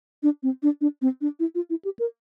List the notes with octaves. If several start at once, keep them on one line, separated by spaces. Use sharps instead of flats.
D4
C4
D4
D4
C4
D4
E4
F4
E4
G4
A#4